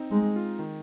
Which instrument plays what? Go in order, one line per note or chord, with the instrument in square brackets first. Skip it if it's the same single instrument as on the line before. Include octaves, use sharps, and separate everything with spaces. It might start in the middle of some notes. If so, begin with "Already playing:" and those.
Already playing: [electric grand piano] C4 D#4
[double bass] G#3 [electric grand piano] D#4
[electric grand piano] F4
D#3